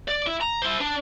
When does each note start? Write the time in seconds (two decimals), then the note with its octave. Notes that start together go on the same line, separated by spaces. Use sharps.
0.08 D5
0.27 E4
0.41 A#5
0.62 E4 C5
0.81 D4